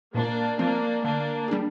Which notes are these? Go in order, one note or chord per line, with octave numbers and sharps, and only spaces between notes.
A#2 A#3 D4
F3 A#3 C4 D4
D3 A#3 D4
G3 D4 G#4